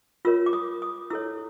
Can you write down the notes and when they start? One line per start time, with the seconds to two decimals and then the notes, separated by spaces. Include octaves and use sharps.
0.25 F4 A#4 C#5 E6
0.46 D6
0.53 D#6
0.82 D#6
1.10 E4 A4 C#5 E6